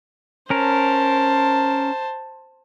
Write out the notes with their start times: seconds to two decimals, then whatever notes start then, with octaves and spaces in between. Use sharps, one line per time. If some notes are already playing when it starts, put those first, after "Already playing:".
0.50 C#4 A#4 C5 A5